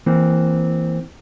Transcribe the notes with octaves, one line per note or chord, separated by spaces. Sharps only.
E3 A#3 C4